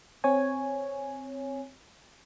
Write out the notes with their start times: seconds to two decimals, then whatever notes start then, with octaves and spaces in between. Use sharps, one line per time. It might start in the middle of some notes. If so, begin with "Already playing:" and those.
0.24 C4 C#5 G#5